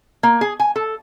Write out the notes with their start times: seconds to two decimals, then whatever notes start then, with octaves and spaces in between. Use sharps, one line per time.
0.23 A#3
0.41 G#4
0.60 G#5
0.76 A4